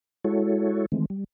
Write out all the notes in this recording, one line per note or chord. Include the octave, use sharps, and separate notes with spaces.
G#3 E4 F#4 A4 C#5
D#3 E3 G#3 A3 C4
G3